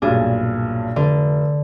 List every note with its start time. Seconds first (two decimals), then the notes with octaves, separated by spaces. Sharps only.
0.02 B1 G2 A#2 D4 G#4
0.96 F1 D3